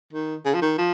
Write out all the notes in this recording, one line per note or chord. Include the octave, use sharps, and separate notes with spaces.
D#3
C#3
F3
D#3
F3